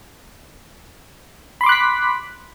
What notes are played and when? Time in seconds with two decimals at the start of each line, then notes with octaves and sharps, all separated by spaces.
1.61 B5
1.64 C6
1.66 D6
1.69 F#6
1.72 B6